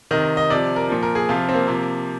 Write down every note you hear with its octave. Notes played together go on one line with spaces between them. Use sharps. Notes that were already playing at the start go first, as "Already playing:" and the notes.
C3 D#3 D#5
D#5
C3 F3 D5
A#4
A#2 F3
A#4
G#4
C3 F3 F4
C4
A#3
C3 F3